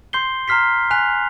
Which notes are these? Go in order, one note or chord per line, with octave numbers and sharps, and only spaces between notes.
C6 G6 C7 G7
A#5 C6 F6 B6 C7
G#5 F#6 B6 F7